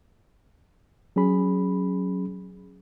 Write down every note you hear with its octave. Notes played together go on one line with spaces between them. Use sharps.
F#3 C#4 G#4 B5